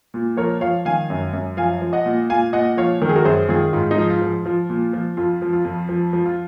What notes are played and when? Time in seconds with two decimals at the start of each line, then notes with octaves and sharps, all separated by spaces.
0.14 A#2
0.37 F3 A#4 C#5
0.61 F3 C#5 F5
0.85 D#3 F5 G#5
1.10 F#2
1.33 F#2
1.57 F3 F5 G#5
1.81 F3
1.93 D#5 F#5
2.06 A#2
2.30 A#2 F5 G#5
2.53 A#2 D#5 F#5
2.77 F3 C#5 F5
3.02 D#3 A#4
3.09 G#4
3.15 F#4 A#4
3.25 F#2 G#4 C5
3.49 D#3 F4 G#4
3.73 G#2 F4
3.91 D#4
3.98 F3
4.10 F4
4.22 F3
4.45 F3 F4
4.69 A#2
4.93 F3
5.17 F2 F4
5.42 F3
5.53 F4
5.65 F2
5.89 F3
6.13 F3
6.26 F4